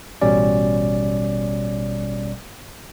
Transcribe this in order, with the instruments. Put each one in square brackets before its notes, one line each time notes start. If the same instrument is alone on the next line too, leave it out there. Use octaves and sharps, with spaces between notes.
[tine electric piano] A1 B2 G3 C#4 D5